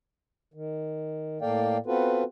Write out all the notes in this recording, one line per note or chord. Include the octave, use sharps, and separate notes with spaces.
D#3
A2 A#3 A4 D5 F5 G5
B3 C4 F4 F#4 A4 B4